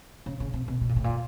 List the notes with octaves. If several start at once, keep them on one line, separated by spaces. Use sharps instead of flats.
C#3
C#3
C3
B2
B2
A#2
A2
A#2